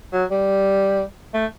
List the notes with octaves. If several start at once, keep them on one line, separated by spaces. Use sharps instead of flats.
F#3
G3
A3